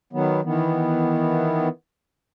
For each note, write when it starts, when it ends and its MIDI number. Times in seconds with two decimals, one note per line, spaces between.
0.13 0.41 51
0.13 0.41 54
0.13 0.41 59
0.45 1.68 51
0.45 1.68 52
0.45 1.68 59